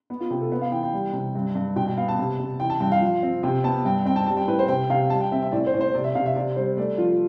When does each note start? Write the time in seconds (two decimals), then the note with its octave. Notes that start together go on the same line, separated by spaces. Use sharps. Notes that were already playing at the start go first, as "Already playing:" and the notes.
0.10 B3
0.20 F4
0.30 C3 G4
0.41 A4
0.52 B3 B4
0.61 F5
0.72 E3 G5
0.83 G5
0.93 G3
1.13 C3
1.35 G2
1.55 G2
1.76 B2 G5
1.86 G5
1.97 B3 F5
2.08 A5
2.19 C3
2.39 C3
2.60 E3 G5
2.70 A5
2.80 G2 G5
2.92 F5
3.01 F3
3.23 C4
3.43 C3 G5
3.64 B3 A5
3.85 G2 G5
4.05 C4 G5
4.16 A5
4.26 G3 A5
4.37 G5
4.48 A2 B4
4.59 C5
4.68 C3 G5
4.90 C3 F5
5.10 G3 A5
5.20 G5
5.32 C4 E5
5.42 E5
5.52 A2 D5
5.66 C5
5.74 A2
5.81 C5
5.94 C3 D5
6.04 E5
6.15 C3 F5
6.26 E5
6.36 C3 D5
6.56 G3 C5
6.77 A3 D5
6.98 F3 F4